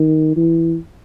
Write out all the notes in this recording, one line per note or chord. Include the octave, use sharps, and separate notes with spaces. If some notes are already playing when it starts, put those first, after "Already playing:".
Already playing: D#3
E3